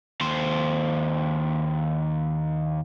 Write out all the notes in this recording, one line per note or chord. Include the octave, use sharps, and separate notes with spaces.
D#2 C5